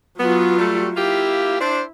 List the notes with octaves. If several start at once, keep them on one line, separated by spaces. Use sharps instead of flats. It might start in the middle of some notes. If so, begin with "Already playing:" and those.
F#3 B3 F4
G3 A3
A#3 E4 F4 G4
D4 C5